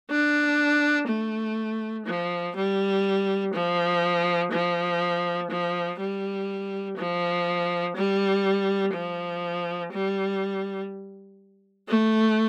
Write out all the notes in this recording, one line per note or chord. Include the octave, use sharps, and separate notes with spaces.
D4
A3
F3
G3
F3
F3
F3
G3
F3
G3
F3
G3
A3